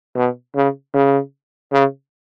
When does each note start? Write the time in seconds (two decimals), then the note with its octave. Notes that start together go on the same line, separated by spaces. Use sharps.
0.16 B2
0.56 C#3
0.94 C#3
1.72 C#3